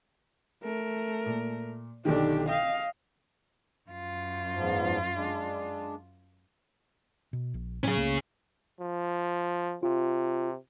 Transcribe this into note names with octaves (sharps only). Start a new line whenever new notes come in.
A3 A#4
A#2
B1 D3 D#3 D4 G4
D#5 F5 G5
F#2 F4
E2 G#2 F3
G#3 D4
B2
A#1
A2 F#3 C#4 G#4
C#2 A3 A#3
F3
C3 F4